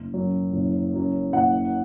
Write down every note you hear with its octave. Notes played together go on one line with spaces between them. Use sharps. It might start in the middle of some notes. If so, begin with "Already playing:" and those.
Already playing: F#1
F#2 F#3
F#1
F#2 F#3
F#1 F#5